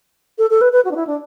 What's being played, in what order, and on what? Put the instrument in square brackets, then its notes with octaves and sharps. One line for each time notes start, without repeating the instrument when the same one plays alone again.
[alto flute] A4
A4
B4
B4
F#4
D4
E4
D4